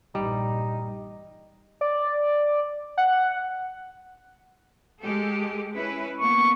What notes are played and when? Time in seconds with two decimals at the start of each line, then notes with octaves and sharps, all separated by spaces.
0.15 A#1 G2 E3 G3 D#4
1.81 D5
2.97 F#5
5.02 G#3 G4 A4
5.75 C#4 E4 B4
6.20 A#3 B3 C#6